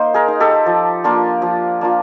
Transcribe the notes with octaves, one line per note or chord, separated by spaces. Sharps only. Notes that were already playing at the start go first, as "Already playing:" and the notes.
Already playing: A#3 D#4 C5
G#4 A#4
D#4
G4 A4
F3
A#3 D4 F4
F3
A#3 D4 F4